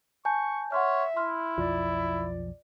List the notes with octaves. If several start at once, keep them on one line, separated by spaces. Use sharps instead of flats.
G#5 A5 C#6 G6
C#5 E5 F#5 C6 F6
E4 C6 F6
B1 F2 F3 F4 D5